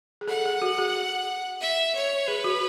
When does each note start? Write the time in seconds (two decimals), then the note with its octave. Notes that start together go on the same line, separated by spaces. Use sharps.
0.21 G#4
0.28 A4 F#5
0.45 G#4
0.62 F#4
0.78 G#4
1.61 E5
1.95 C#5
2.28 G#4 B4
2.44 F#4